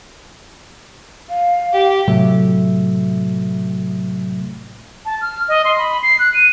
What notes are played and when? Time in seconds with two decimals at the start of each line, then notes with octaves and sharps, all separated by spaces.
1.29 F5
1.74 G4
2.08 A2 C3 F#3 A3 E5
5.05 A5
5.21 F6
5.48 D#5
5.65 C6
5.78 B5
6.03 C7
6.19 F#6
6.34 D#7